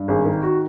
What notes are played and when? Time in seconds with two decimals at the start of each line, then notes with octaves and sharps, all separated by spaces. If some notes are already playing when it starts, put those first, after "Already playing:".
Already playing: G2
0.08 G#1 G#4
0.25 D#3
0.43 F#4